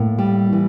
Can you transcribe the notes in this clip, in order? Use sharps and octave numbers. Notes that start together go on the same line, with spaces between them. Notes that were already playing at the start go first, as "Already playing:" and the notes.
Already playing: A2 A#3
G3
E3